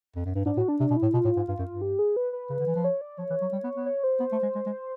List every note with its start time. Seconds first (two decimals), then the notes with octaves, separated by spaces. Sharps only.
0.16 F2
0.25 F#2
0.35 G2
0.45 G#2 D4
0.57 A2 F#4
0.68 D4
0.80 C3 D4
0.90 B2
0.96 E4
1.02 A2
1.14 B2 F4
1.25 A2
1.37 G#2
1.48 G2 F4
1.59 F#2
1.71 G2
1.81 G4
1.99 G#4
2.16 B4
2.33 B4
2.50 C#3
2.59 D3
2.67 E3
2.76 F3
2.84 C#5
3.01 D5
3.18 F3 C#5
3.30 E3
3.41 F#3
3.52 G3
3.64 B3
3.75 B3
3.86 C#5
4.04 C5
4.20 B3
4.32 A3
4.43 G#3
4.55 G#3
4.66 G#3